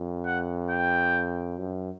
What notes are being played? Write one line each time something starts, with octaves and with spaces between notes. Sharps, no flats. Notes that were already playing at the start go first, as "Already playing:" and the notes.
Already playing: F2
F#5
G5
F#2